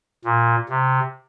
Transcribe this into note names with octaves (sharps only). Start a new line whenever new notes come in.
A#2
C3